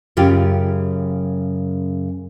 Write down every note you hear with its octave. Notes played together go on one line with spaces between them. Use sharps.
F#2 C#3 F4 G4